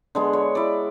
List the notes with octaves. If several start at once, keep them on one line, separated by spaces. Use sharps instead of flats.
D3 G#3 B3
C#5
E4 D5